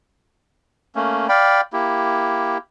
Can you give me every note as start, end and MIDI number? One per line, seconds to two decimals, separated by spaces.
0.95 1.27 57
0.95 1.27 58
0.95 1.27 61
1.29 1.61 74
1.29 1.61 77
1.29 1.61 79
1.29 1.61 83
1.73 2.58 58
1.73 2.58 64
1.73 2.58 67